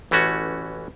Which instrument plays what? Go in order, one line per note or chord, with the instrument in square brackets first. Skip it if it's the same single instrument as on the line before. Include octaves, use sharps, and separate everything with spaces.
[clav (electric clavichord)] A1 E3 A3 C#4 F#4